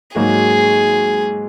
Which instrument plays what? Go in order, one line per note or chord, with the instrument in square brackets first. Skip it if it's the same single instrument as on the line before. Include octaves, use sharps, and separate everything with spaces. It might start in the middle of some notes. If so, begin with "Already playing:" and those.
[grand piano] G#2 F#3 A#3 D#4 F#4 [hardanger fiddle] G#4